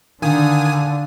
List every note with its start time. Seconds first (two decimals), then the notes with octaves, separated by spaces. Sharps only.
0.22 D3 D#3 D4 F5 G#5 D#6